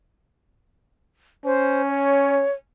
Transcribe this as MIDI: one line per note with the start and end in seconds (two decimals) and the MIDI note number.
1.45 2.45 61
1.45 1.82 72
1.89 2.52 73